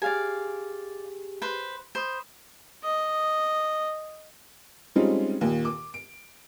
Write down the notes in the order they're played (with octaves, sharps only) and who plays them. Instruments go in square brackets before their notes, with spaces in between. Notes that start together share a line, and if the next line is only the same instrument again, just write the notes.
[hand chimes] G4 G#4 [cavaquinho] D5 F5 G#5
[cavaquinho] B4 C5
[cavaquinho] C5 [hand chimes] B5 D#6
[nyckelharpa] D#5
[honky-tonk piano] G3 G#3 C4 C#4 D#4 F4
D#2 A#2
D6
D7